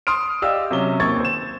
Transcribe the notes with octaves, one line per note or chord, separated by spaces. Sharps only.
C6 D#6 F6 D7
G4 D5 D#5 F5 E6
C3 F#3 C#4 G7
D#2 C4 C#6 G#6 A6
C5 E7